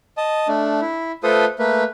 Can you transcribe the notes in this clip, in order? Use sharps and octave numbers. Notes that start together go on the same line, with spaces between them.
D#5 A5
A3 D4
E4
A3 F4 A4 B4 C5 D#6
A3 A#3 B4